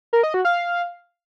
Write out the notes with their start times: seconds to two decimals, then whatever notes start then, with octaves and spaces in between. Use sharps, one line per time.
0.13 A#4
0.23 D#5
0.34 F#4
0.45 F5